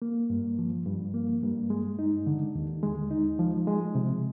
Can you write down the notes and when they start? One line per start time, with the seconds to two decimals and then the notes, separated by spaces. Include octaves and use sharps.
0.02 A#3
0.30 G2
0.59 F3
0.86 G2
1.14 A#3
1.43 G2
1.70 G#3
1.99 D#4
2.27 D3
2.55 D#2
2.83 G#3
3.11 D#4
3.39 F3
3.67 G#3
3.95 C3